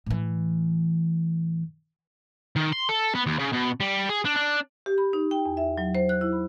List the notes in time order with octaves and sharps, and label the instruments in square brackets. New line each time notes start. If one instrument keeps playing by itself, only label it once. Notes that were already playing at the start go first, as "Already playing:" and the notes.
[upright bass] A2 E3
[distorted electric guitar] D#3
C6
A4
B3
D#2
C#3
B2
G3
G#4
D4
D4
[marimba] G4
B5
D#4
G5
E2
E5
F#3
C5
F#6
E4
B5